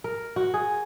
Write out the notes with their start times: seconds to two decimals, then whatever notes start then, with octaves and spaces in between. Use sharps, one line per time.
0.04 A#4
0.36 F#4
0.54 G#4